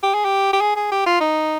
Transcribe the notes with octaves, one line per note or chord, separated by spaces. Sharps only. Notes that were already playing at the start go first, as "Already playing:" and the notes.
G4
G#4
G4
G4
G#4
G#4
G4
F4
D#4